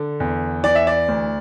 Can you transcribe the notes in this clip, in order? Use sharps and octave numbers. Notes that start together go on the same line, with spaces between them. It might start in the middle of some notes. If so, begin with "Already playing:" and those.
Already playing: D3
E2
E3 D5
E5
D5
D2